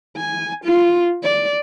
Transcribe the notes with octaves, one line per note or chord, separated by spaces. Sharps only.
G#5
F4
D5